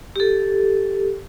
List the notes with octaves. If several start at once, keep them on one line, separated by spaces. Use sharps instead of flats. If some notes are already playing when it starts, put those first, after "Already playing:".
G4 A4